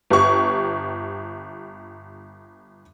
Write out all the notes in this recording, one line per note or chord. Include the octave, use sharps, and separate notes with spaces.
G1 G4 C#6